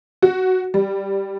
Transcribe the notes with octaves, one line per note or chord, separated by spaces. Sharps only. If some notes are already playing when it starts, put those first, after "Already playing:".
F#4
G3